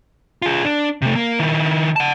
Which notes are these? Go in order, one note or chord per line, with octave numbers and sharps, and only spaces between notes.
F4 G#4
D4
C3 A3
A#3
D#3 E4
F#5 A5